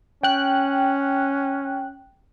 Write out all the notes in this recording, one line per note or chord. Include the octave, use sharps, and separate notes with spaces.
C#4 G5 F#6